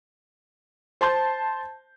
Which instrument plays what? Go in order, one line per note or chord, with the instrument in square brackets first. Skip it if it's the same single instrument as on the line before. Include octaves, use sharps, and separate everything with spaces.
[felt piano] C5 A5 C6 G6